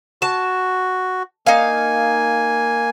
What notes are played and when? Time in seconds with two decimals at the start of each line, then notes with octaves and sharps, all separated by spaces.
0.22 F#4 A5
1.47 A#3 D#4 F5 G#5